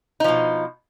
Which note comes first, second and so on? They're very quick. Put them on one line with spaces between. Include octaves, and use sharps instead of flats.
D#4 F3 B2